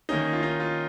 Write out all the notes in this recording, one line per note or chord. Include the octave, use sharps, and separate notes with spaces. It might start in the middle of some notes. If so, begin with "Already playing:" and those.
D#3 A#3 C#4 D#4
F4
D#4
F4